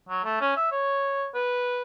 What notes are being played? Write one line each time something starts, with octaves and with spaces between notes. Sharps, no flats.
F#3
A3
C#4
E5
C#5
B4